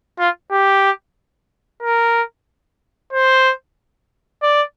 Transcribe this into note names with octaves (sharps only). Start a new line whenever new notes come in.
F4
G4
A#4
C5
D5